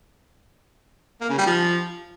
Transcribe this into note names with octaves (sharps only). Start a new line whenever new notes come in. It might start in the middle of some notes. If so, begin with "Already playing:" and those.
A#3
C#3
G3
F3